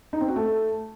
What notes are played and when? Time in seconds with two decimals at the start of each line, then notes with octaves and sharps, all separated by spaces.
0.13 D#4
0.21 C4
0.28 F#4
0.36 A3